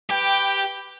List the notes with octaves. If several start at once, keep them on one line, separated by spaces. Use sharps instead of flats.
G4 B4 G5